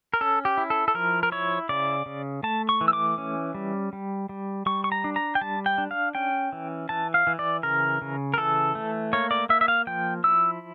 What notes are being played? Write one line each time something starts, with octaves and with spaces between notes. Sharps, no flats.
A#4
C#4 A4
G4
E4
A4
A4
F3 A#4
A#4
E4 C#5
C#3 D5
C#3
A3 A5
C#6
E3
E6
D6
C#4
G3
G3
G3
G3 C#6
C#6
A#5
D4
A#5
G5
G3 A5
G5
D4
F5
C#4 G5
E3
E3 A5
F5
E3
D5
C#3 A#4
C#3
A#4
E3 A4
A3
A#3 C#5
D5
A#3 E5
E5
F5
F3 G5
E4 E6